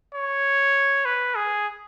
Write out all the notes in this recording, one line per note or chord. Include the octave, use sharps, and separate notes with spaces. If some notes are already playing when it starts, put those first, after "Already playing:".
C#5
B4
G#4